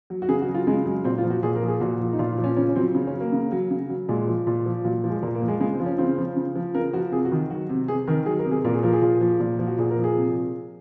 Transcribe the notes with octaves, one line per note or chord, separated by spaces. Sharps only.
F#3
F#4
C#3 G#4
F#4
F#3
F4
C#3 G#3
F#3 G#3
A#2 C4
F4
F3
F#4
A#2 G#4
A#4
F3
G#4
A#2 F#4
F3
D#4
A#2 F4
F4
F3
C#4
C#3 C#4
C#4
F#3 C4
C#3
C#4
F#3
A#3
C#3
F#3
C#3
F#3
A#2 G#3
F3
A#2
F3
A#2 F#3
F3
G#3
A#2 A#3
A#3
F3
G#3
C#3 G#3
C4
F3
C#4
C#3 C4
F3
C#3
F3
C#3 A#4
F3 F#4
C3 G#4
F#4
D#3
F#3 F#4
C3
C3 G#4
D#3 A#4
F#3 G#4
A#4
C3
G#4
A#2 A#4
G#4
F3 A#4
G#4
A#2
F3
A#2
F3
F#4
A#2 G#4
A#4
F3
G#4
C3